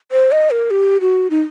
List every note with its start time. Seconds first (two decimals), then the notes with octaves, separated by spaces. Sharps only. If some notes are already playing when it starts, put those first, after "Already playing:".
0.12 C5
0.32 D#5
0.51 A#4
0.71 G4
1.01 F#4
1.30 D#4